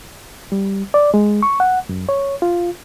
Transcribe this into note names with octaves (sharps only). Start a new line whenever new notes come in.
G3
D5
G#3
C#6
F#5
F#2
C#5
F4